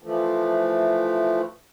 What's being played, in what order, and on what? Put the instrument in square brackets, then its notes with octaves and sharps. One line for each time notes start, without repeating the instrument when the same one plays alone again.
[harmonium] E3 F3 A3